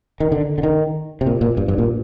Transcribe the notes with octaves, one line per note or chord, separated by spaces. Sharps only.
D#3
D3
D3
D#3
C3
A#2
A#2
G2
G2
A#2